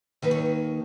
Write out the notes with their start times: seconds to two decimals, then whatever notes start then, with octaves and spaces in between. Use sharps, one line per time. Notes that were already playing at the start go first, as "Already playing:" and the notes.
0.22 D#2 D#3 B4
0.31 C#5